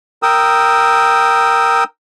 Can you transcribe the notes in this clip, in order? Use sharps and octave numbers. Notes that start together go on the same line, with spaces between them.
A#4 G5 D#6 E6